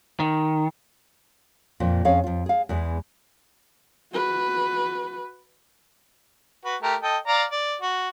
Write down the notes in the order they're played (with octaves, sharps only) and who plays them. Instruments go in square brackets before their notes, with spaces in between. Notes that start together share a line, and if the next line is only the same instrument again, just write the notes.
[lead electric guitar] D#3
[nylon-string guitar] F2 A#2 F3 A#3
F2 C#4 G#4 C#5 F5
F2 F4
G#4 F5
E2 E3 G#3
[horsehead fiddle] F#4 B4
[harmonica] F#4 B4
A3 G4 A#4
A4 D#5 G5
D5 F5 A#5
D5
F#4